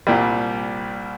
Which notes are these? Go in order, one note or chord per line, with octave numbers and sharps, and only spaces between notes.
C2 A#2 G3